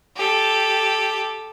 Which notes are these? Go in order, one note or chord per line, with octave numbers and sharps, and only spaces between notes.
G4 A4